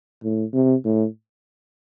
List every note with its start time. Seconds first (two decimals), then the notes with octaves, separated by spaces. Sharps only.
0.23 A2
0.54 C3
0.85 A2